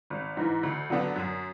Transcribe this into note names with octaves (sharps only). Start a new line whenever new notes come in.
G#1
G#2 E3
D2
D3 F#3 B3 D4
F#2